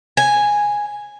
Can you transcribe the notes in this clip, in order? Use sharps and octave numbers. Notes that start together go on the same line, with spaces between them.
G#5